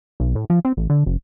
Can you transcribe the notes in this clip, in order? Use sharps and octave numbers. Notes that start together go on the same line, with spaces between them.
B1
A2
F3
C4
A1
D3
F#1